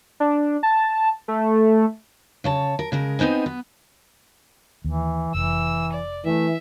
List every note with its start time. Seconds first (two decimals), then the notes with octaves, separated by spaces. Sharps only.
0.20 D4
0.63 A5
1.28 A3
2.44 C#3 C#5 A5
2.79 A#4
2.92 C#3 G#3 A#4
3.19 B3 C4 D#4 C5 G#5
3.46 B3
4.84 D#2 E3
5.34 F1 E3 E6
5.93 D5
6.25 E3 A3 E5